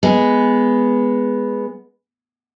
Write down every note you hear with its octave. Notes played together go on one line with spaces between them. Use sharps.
G#3 B3